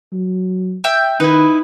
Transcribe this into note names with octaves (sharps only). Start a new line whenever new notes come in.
F#3
E5 G5
D#3 D#4 E4 B4